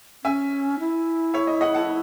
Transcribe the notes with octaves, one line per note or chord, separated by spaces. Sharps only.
C#4 E5 G#5
E4
C#5 E5
D#5
D#5 F#5
F#5 A5